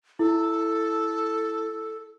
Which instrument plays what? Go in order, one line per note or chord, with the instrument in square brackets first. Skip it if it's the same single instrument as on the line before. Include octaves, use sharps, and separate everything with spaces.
[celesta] E4 [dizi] A4